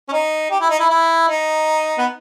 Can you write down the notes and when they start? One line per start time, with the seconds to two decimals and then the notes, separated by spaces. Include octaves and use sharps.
0.08 C#4
0.13 D#4
0.51 G4
0.60 E4
0.70 D#4
0.79 E4
0.90 E4
1.28 D#4
1.98 B3